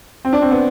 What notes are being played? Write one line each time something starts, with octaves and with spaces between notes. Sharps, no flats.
C4
D4
C4
B3